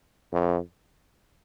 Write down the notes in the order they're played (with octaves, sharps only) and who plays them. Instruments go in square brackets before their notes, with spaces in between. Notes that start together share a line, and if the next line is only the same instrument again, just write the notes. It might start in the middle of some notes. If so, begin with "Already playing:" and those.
[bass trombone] F2